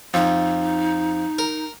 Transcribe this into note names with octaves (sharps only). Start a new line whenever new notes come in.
F2 D#4
A#4